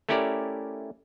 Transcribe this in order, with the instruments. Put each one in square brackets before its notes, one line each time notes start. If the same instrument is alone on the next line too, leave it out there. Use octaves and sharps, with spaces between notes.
[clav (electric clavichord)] A3 C#4 E4 G4 A#4 D5